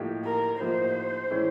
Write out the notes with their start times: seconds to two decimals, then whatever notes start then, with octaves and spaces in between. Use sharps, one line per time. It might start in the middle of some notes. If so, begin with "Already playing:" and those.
Already playing: A2 F3 A#3 D#4 G4
0.25 A#4
0.60 A2 F3 A#3 D#4 G4 C5
1.30 A2 E3 G#3 C#4 E4